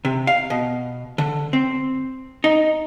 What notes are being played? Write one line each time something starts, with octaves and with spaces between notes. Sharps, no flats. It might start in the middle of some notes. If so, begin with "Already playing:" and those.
C3
F5
B2
D3
C4
D#4